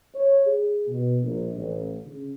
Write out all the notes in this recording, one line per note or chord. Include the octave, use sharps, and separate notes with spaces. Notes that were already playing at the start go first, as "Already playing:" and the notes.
C#5
G#4
B2
A#1
A1
C#3